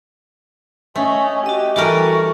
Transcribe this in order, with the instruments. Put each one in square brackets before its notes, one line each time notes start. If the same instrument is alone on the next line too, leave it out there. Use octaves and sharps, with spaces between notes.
[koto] A3 [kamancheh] C#4 D#5
[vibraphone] F#4 D#5 [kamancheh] G4
[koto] E3 G3 A#4 [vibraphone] F#4 A4 A5 [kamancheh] C#6